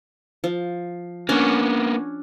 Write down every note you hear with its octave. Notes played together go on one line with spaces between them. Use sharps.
F3
A#3 B3 C#4 D4